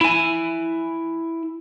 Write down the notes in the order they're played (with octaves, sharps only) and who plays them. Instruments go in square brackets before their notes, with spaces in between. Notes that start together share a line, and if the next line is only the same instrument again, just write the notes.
[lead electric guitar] E4 G#5